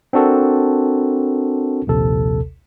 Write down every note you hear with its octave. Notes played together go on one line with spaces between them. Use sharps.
C4 D4 F#4 A4 A#4
A#1 D#2 C3 A4